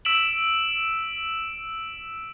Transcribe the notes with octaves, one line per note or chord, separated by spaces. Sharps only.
E6 B6 D7 E7 F#7